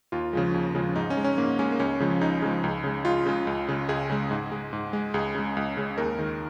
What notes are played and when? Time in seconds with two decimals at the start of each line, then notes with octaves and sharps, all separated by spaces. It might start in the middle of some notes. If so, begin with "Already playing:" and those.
0.12 D#2 F4
0.33 C#3 F3 G#3
0.54 D#2
0.75 C#3 F3 G#3
0.96 G#2 D#4
1.10 C#4
1.17 G#3
1.24 C#4
1.38 G#2 A#3
1.59 G#3 C#4
1.72 A#3
1.80 C#2 C#4
2.00 C#3 F3 G#3
2.21 C#2 D#4
2.42 C#3 F3 G#3
2.64 C#2
2.84 C#3 G#3
3.05 C#2 F4
3.26 C#3 G#3
3.47 C#2
3.68 C#3 G#3
3.89 C#2 G#4
4.10 C#3 G#3
4.31 G#2
4.51 G#3
4.73 G#2
4.93 G#3
5.14 C#2 G#4
5.35 C#3 G#3
5.57 C#2
5.77 C#3 G#3
5.98 D#2 A#4
6.19 D#3 G#3